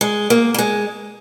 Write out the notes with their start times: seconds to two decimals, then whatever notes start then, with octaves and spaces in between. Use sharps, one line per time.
0.01 G#3
0.30 A#3
0.54 A#3
0.58 G#3